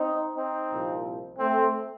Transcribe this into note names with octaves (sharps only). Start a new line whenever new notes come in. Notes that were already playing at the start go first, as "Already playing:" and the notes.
Already playing: C4 D#4
C4 D#4
C2 A#2 F3
A3 C4